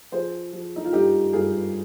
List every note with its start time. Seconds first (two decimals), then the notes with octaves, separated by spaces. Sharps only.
0.12 F3 G#4 C5
0.53 F3
0.76 D#4
0.85 F4
0.93 G2 D#4 G4
1.33 G2 F4 G#4